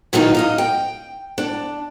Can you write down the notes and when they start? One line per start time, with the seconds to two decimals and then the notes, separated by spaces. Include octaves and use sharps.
0.13 A#2 D#3 E3 F#3 D#4 F4
0.35 F#2 D#5 F5
0.58 G5
1.38 D4